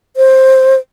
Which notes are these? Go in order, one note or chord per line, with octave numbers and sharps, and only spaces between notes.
C5